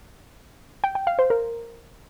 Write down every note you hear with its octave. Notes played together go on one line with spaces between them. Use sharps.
G5
G5
F5
C5
A#4